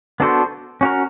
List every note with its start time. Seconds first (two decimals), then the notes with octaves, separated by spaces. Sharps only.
0.20 B3 D4 F#4 A4 C5
0.81 C#4 F#4 A#4